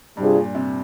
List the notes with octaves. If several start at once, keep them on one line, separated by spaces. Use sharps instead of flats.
G2 C3 G3 D4 F4 G#4
A#2
C3